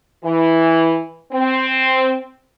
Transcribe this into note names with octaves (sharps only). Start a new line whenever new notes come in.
E3
C4